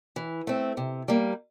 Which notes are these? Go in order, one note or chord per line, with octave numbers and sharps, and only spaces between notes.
E3
A3 C4
C3
G3 A#3